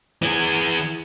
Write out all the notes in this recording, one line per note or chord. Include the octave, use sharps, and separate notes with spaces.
E3 G#4